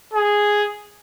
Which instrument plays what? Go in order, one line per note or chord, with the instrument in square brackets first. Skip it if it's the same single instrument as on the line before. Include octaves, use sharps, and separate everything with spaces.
[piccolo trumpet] G#4